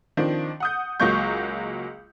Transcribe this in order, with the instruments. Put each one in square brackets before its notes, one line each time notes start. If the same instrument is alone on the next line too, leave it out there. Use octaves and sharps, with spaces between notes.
[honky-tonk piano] D#3 F3 C4 D4
F#5 D#6 G6
C#2 F#3 G#3 A#3 C#6 G6